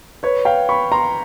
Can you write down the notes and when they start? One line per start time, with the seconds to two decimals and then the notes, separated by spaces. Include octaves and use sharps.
0.23 B4 C#5
0.45 F5 G5
0.69 B5 C#6
0.92 A#5 C6